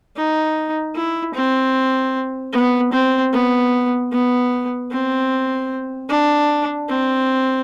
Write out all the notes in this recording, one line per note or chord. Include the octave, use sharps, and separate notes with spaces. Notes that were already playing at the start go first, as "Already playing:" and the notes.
D#4
E4
C4
B3
C4
B3
B3
C4
D4
C4